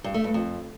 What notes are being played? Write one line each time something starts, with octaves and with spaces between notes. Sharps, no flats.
G2
A3
G2
F2